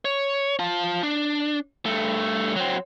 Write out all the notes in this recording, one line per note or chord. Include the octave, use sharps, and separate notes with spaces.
C#5
F4 A5
D4
G2 A3
F#3 C4